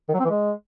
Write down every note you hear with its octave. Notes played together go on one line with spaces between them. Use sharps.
D#3
F#3
C4
E3
G#3